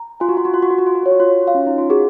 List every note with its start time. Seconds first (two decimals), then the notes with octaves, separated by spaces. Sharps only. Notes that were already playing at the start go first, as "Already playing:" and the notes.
Already playing: A#5
0.20 F4 G#5
0.29 F#4
0.37 F4
0.45 F#4
0.54 F4
0.62 F#4 C6
0.71 F4
0.79 F#4
0.87 F4
0.95 F#4
1.04 F4 C#5
1.12 F#4
1.20 F4
1.48 F5
1.55 C#4
1.67 D#4
1.78 F4
1.90 F#4 G#4